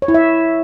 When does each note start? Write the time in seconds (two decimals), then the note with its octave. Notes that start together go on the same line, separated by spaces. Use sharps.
0.02 C#5
0.08 E4
0.14 E5